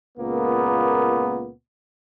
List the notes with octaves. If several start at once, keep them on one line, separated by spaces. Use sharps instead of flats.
C#2 A#2 A#3 B3